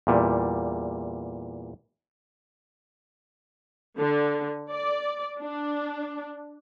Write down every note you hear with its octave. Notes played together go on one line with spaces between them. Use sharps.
E2 A#2 G3
D3
D5
D4